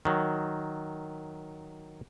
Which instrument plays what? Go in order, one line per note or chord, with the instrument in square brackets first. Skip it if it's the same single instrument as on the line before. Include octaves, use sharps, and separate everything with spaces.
[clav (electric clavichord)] D#3 F#3